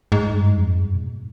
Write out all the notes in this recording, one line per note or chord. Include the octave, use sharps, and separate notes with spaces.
G#2
G2
F2
G2
B2
G#2